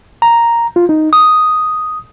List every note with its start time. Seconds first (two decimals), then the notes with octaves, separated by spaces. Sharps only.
0.22 A#5
0.76 F4
0.89 D#4
1.13 D#6